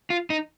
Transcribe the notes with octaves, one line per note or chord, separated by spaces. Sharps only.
F4
D#4